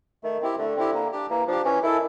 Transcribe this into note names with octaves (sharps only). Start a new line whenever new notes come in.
D#3 A3
C4 E4 G4
D3 A3
C4 E4 G4
A#3
D4 G4
E3 A#3
F3 D4 G4
E3 C#4
D#3 E4 A4